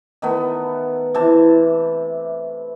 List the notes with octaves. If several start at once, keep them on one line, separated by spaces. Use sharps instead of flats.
D#3 A3 B3
C3 E3 A5